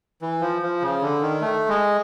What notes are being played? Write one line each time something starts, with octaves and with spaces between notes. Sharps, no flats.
E3
F3
F3
C#3
D3
D#3
A3
G#3